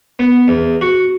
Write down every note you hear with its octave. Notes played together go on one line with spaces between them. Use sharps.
B3
E2
F#4